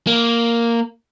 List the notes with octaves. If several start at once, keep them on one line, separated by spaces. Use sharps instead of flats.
A#3